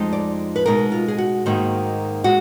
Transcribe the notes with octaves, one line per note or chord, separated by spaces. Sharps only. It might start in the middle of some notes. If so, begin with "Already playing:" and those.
Already playing: F2 F3 G#3 D#4
D5
B4
B2 G#3 D#4 A#4
F4
G#4
F#4
G#2 D#3 A#3 D#4
G#3 F#4